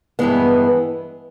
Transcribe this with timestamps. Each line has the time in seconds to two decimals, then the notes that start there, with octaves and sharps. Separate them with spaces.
0.19 G2 E3 G#3 B3